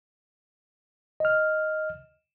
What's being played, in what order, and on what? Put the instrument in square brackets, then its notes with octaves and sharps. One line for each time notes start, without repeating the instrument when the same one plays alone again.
[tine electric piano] D#5 F6